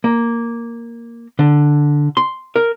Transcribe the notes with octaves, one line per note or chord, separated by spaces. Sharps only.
A#3
D3
C6
A#4